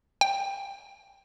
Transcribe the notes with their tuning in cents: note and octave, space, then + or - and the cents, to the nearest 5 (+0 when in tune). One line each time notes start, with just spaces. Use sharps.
G5 +15